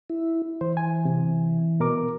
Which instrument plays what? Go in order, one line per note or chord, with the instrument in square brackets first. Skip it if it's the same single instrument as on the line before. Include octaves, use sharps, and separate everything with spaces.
[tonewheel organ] E4
[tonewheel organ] E3 [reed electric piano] C5
[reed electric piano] G#5
C3
B2 A#4 D6